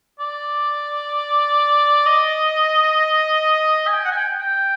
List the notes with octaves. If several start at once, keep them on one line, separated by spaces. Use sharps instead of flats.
D5
D#5
G#5
G5
F#5
G#5
G5
G5